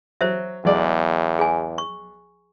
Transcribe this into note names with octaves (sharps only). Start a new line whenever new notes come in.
F#3 C5 E5
B1 E2 G#3 D5
G#4 G#5
C#6